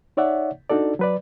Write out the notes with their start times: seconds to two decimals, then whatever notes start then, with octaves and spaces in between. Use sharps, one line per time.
0.17 D#4 C#5 D5 E5 F#5
0.69 D4 D#4 F#4 A4 D5
0.99 F#3 B4 D5